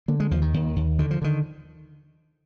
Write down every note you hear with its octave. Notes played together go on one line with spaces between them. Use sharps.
D3 A#3
G#3
D#2 F3
D#3
D#2
D#2
D3 D#3
F3
D3 D#3